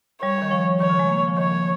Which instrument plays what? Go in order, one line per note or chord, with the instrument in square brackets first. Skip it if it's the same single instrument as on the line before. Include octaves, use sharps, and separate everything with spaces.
[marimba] G3 [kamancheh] C#5
[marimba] D#3
F3
[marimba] D#3 [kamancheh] C#5
[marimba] C#3
G#3
A#3
F3
[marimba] D#3 [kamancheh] C#5